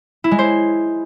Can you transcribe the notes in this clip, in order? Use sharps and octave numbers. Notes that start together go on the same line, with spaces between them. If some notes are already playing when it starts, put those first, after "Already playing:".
E4
G#3
C5